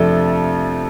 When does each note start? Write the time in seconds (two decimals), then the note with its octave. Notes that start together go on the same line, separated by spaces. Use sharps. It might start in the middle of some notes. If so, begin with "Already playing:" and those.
Already playing: F2 C3 F3 A3 D4 A4